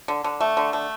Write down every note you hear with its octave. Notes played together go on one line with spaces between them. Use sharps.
D3
D3
A3
D3
A3